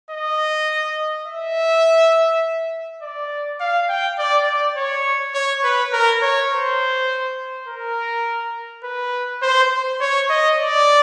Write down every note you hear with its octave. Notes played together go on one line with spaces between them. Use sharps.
D#5
E5
D5
F5
G5
D5
D5
C#5
C#5
B4
A#4
C#5
C5
A#4
B4
C5
C#5
D#5
D5